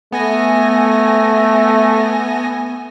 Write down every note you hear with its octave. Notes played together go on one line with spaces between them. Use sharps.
A3 B3 G#5 A#6